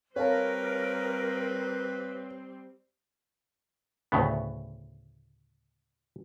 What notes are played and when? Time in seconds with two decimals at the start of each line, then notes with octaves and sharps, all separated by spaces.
0.16 G3 C4 A#4 B4 C#5 F5 A5
4.12 D2 A2 C#3 B3